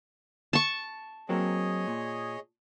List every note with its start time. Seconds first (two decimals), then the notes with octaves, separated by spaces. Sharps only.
0.53 A5 C#6
1.29 F#3 A#3 C4 G#4 C#5 D#5
1.87 A#2